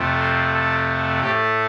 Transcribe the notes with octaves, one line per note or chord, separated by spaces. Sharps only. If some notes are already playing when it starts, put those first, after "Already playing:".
Already playing: F2 C3 F3 A3
C5
A4
A2 A3 G4